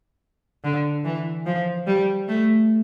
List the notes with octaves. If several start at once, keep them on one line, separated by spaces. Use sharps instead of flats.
D3
E3
F3
G3
A3